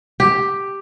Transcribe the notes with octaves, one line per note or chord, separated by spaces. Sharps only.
G4